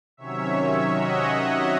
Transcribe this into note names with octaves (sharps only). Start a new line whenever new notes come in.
C3 D#3 F#3 C#4 C#5 E5
D#5 F#5